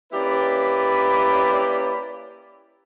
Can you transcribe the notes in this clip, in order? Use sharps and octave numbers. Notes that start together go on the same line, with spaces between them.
A#3 C#4 E4 G4 B4 D5